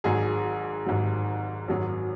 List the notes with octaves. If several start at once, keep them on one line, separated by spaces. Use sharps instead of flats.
G#1 G#2 F#3 G#4
G#1 G#2 F#3
G#1 F#2 F#3